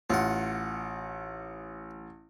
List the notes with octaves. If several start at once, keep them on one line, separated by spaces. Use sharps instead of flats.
A1 F4 F#5